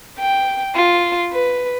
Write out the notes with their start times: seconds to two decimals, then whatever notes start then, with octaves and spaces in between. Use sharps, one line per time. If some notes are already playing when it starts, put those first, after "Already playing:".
0.19 G5
0.75 F4
1.32 B4